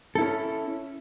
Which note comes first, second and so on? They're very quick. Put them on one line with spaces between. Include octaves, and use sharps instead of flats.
A4 E4 C#4